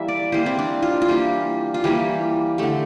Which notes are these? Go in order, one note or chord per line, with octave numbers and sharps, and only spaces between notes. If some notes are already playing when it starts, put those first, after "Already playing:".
Already playing: E3 G3 A#3 E5
D5
E3 G3 A#3 C5
C4
D4
F4
F4
E3 G3 A#3 G4
F4
E3 G3 A#3 G4
D3 A3 G4